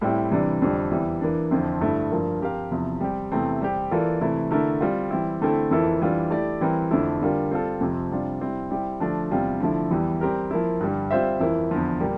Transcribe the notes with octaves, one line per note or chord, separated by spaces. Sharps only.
A2 G3 C4 E4
C3 E3 G3 D4
F2 D3 G3
E2 E3 G3
E3 A#3 D4
F2 D3 F3 C4 E4
G2 D3 A3 E4
G2 F3 A#3
F3 C4 G4 A#4 F5
E2 C3 F3
G3 C4 G4
E2 C3 E3 A3 C4
G3 C4 G4
E3 A#3 F4 A4 D5
C3 E3 A3 E4
D3 A3 E4 A#4
G3 C4 F4
E3 G3 C4 E4
D3 A3 C4 E4 A4
F2 E3 A#3 E4 A4
E3 G3 D4 F4
A3 E4 G4 D5
E3 G3 C4 E4 A#4
F2 D3 A3 E4
D3 G3 A#3 F4
G3 C4 F4 A4
F2 C3 F3
C3 G3 D4 F4
G3 C4 E4
G3 C4 E4 G4
D3 F3 A3 D4
E2 C3 G3 C4 F4
D3 F3 A3 E4
E2 E3 G3
G3 C4 G4 A#4
F3 A#3 E4
G2 D3 G3
G3 C4 F4 C5 E5
F2 E3 A#3 E4
E2 D3 F3
A#2 G3 A#3